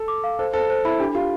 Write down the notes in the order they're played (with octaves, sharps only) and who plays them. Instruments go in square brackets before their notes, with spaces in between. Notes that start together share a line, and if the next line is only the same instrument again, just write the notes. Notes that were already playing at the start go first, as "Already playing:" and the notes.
Already playing: [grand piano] A4
[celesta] D6
F5
[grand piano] A4 [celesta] C5
[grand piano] A4 [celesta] C5
[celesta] C5
[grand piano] E4 [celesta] B5
[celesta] D4 [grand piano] G4
[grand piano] F4 [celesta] G4